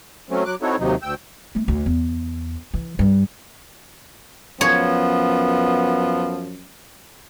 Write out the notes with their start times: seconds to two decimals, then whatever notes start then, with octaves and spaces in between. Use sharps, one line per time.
0.30 F#3 A3 C4 C#4
0.45 F#3 D6 F#6
0.62 C4 D#4 E4 F#4 A4 C#5
0.79 D#2 C3 F#3 D#4
1.02 D2 G5 E6
1.55 A3 D#4
1.68 D2
1.86 E2
2.74 E3
2.99 G2 G3
4.61 F#2 F3 B3 C#5